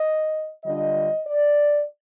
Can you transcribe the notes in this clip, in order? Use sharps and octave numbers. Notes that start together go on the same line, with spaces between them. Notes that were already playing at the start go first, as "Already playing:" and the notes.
Already playing: D#5
D3 G3 D4 F4 D#5
D5